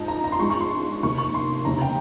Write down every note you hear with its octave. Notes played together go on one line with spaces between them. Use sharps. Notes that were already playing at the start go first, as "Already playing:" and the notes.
Already playing: G#2 F3 D#4
A#5
A#5
C6
G#2 F3 G#3 C#6
C#6
C6
F1 D#2 D#3 C#6
C#6
C6
F1 D#2 C#3 A#5
G5